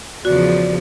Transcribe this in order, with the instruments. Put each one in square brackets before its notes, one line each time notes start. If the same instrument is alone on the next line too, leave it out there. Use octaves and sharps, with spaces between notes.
[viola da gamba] E2 C#3 F3 [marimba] F#4 [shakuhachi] D5